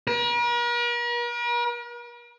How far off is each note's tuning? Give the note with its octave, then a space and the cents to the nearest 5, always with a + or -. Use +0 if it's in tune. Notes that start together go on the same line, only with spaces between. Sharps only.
A#4 +45